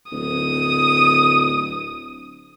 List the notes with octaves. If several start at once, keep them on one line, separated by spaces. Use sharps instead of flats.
D1 D#6